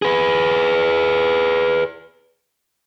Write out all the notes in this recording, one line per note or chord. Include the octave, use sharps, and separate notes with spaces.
G#4 B4